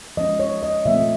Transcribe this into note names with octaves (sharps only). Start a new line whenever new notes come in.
F3 G#3 C#4 D#5
C#5
D#5
A#2 F3 A3 C4 E5